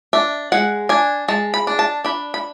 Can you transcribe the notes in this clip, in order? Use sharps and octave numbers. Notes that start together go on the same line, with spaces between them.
D4 E5
G#3 F#5
D4 G#5
G#3 A5
B5
D4
A5
D4 B5
B5